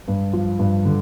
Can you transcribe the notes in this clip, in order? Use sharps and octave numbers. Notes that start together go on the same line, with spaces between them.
G2
F3
G2
D3